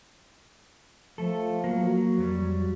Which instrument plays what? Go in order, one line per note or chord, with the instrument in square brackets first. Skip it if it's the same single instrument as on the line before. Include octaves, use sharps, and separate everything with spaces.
[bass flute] F3 [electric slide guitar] A3 A4
[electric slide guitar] F#3 A#3
[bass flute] F#4
[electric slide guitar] F2 F#3 G3